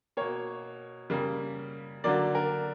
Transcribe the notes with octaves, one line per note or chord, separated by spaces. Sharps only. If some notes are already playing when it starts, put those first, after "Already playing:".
B2 A#3 C#5
C#3 G3 A#3
D3 F#3 A#3 D5
A#4